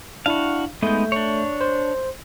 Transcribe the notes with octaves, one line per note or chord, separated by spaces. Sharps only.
D4 E4 F#4 F5
G#3 A3 B3 D#4 G6
D4 C#5
C5